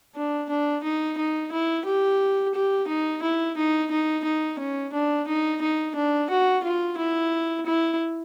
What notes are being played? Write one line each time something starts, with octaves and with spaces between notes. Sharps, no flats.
D4
D4
D#4
D#4
E4
G4
G4
D#4
E4
D#4
D#4
D#4
C#4
D4
D#4
D#4
D4
F#4
F4
E4
E4